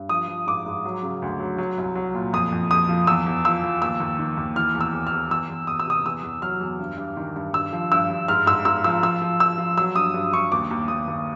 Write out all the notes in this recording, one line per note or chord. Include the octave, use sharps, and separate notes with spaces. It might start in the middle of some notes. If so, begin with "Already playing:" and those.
Already playing: G2
F3 D#6
F3
G#2 D6
G#2
F#3
C#3
D2
F#3
F#3
C2
F#3
A#2
F2 D#6
F2
F2 D#6
F3
E2 E6
E2
F3 E6
F3
D#2 E6
D#2
D#3
D#2
E3 F6
E2
E6
E2
F6
E2
E2 E6
E2
E2 D#6
E6
C3 D#6
E2 E6
E2
F#3 F6
E2
G2
G2
D#3
G2
G2 E6
F3
G2 E6
G2
G#2 F6
G#2 E6
G#2 E6
F3 E6
F3 E6
F3
F3 E6
F3
F#3 E6
G2 D#6
G2
G2 C#6
D#2 D6
D#2
D#2 D#6
D#2